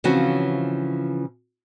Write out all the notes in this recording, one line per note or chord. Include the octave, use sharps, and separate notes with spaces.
C#3 E3 F3 C4 C#4 F#4